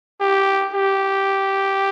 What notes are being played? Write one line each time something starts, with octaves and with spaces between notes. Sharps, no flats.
G4
G4